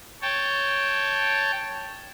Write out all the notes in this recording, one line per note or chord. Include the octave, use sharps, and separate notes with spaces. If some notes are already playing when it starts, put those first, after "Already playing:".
C#5 G5 A5